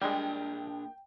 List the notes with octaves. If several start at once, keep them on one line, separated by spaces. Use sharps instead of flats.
A#2 G3 G#3 D4 A#4 G5